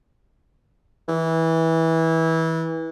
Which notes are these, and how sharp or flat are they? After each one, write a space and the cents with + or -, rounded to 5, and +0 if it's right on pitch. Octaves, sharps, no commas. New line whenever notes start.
E3 -20